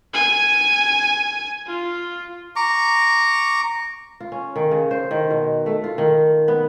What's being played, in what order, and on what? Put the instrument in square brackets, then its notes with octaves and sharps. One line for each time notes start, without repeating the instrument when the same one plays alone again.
[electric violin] G#5
F4
[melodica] A#5 C#6 D6
[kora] F4
C#4
D#3
C#3
C5
D#3
B2
A3
F4
D#3
B3